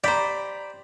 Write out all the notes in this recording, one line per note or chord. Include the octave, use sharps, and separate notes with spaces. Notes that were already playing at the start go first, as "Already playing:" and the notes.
G4 C5 D5 A#5 B5 B6